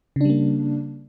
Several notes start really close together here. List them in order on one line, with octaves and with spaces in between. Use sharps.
C#3 D4 G3 A#3